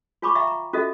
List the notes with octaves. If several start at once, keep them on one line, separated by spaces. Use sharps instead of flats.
F4 C#5 G#5 B5 C#6 D6
E5 F5 G5 A#5 C#6
A#5
C#4 F4 F#4 A4 D#5 E5